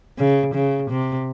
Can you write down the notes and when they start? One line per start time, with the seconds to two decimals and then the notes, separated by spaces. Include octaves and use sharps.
0.18 C#3
0.54 C#3
0.90 C3